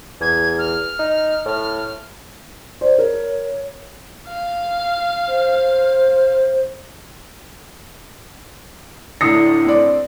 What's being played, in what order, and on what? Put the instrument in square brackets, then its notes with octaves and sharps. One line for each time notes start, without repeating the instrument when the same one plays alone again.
[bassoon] E2 [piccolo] G#6
[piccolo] F6
[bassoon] D#4
[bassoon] A2 [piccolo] F6
[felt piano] C5 [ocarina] D5
[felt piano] A#4 [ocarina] C#5
[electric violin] F5
[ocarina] C5
[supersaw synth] A2 D3 [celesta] E4 D#6 C#7 [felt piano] E6 A#6 C7
[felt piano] C4 D5